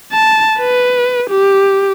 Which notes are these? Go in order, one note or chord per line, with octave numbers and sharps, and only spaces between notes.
A5
B4
G4